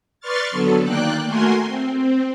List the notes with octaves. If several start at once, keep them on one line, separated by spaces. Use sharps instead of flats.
B4 D5 C6 C#6 F6 A6
D3 F#3 B3 A4
D#3 A#3 D5 G5 F#6
A3 F#4 A#4 G#5 C6
C4
C4